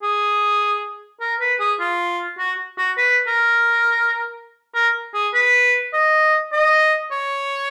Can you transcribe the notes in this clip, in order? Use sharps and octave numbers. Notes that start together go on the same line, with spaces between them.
G#4
A#4
B4
G#4
F4
F#4
F#4
B4
A#4
A#4
G#4
B4
D#5
D#5
C#5